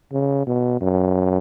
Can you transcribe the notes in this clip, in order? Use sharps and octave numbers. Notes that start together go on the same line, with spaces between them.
C#3
B2
F#2